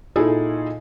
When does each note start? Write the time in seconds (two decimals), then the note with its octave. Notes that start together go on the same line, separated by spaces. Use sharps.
0.16 A#2 D#4 E4 G#4 A4